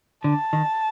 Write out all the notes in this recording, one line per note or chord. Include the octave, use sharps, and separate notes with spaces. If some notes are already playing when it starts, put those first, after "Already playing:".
D3 A5
D#3